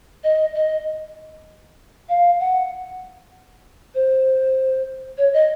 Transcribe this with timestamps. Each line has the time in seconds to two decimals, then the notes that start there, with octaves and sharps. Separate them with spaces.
0.24 D#5
0.55 D#5
2.09 F5
2.40 F#5
3.95 C5
5.18 C#5
5.34 D#5